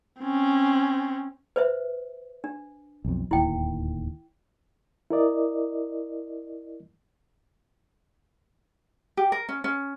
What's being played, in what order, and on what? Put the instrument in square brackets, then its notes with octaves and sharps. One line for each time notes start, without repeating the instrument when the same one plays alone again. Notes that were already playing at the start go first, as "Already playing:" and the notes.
[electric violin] C4 C#4
[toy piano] B4 C5 E5
D4
[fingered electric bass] B1 F2
[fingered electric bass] D1 D#2 [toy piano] E4 G5
[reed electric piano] E4 A#4 D5 D#5
[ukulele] G4
A#4
C#4
C#4